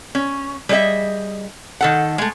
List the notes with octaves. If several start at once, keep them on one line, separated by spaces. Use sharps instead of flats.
C#4
G3 G#4 C5 D#5 E5
D#3 A4 F#5
G#3 A3